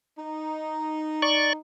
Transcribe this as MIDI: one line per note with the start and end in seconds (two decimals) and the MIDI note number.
0.18 1.57 63
1.22 1.53 74
1.22 1.53 85